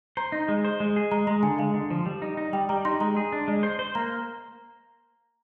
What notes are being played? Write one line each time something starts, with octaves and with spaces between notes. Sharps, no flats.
C5 A#5
D#4
G#3
C5
G#3
G#4
G#3 A#5
G#3 A#5
D3 G#5
G#3 F5
D3
F3
G3
D#4
D#4
G3 G5
G3 A#5
D#4 C6
G#3 A#5
G#4
D4
G#3
C5
C5
A#3 A#5